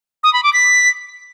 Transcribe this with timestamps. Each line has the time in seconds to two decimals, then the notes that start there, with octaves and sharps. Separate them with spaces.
0.23 D#6
0.33 B5
0.43 D6
0.53 B6